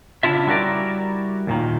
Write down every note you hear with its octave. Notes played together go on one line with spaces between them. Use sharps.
C#3 D4 E4 F4 E5
G3 E4 F#4 A4 A#4 D5
D#2 A#2 D#3